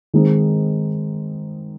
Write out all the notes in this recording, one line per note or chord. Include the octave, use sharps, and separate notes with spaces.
D#3 G#3 C4 D#4